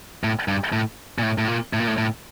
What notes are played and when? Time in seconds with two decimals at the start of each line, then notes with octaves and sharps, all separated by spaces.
0.24 A2
0.48 G2
0.72 A2
1.18 A#2
1.23 A2
1.38 A2
1.48 A#2
1.73 A2
1.80 A#2
1.88 A2
1.98 A2